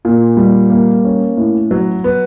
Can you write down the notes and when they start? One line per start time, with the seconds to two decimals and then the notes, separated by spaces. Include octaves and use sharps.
0.05 A#2
0.37 G3
0.70 A#3
1.05 C#4
1.37 A2
1.71 F#3
2.04 B3